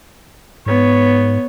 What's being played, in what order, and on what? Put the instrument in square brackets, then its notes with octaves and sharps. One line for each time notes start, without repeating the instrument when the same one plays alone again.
[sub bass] G#2 [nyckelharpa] B3 C#5